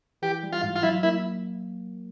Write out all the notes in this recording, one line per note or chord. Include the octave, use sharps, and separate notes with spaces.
E3 G4
G3
F4
G#2
F4
F#3 E4
A#3 E4